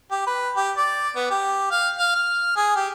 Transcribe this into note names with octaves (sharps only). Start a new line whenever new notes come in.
G4
B4
G4
D5
B3
G4
F5
F5
F6
G#4
G4